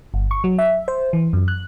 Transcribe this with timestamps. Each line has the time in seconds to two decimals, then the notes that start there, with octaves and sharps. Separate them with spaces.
0.14 G1
0.31 C#6
0.44 F#3
0.58 E5
0.88 C5
1.13 E3
1.33 F#2
1.48 F#6